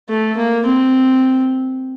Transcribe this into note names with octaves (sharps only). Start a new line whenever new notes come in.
A3
A#3
C4